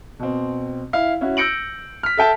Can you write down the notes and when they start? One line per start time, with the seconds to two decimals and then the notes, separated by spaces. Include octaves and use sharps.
0.19 B2 C4
0.93 E4 F5
1.21 C#4 E4 F#4
1.37 E6 G6 A#6 C#7 D7 F#7
2.03 F6 B6
2.17 A4 E5 G5 A5